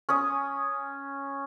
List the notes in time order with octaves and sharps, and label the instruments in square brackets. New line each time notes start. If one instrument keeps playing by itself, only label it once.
[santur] C#4 D#6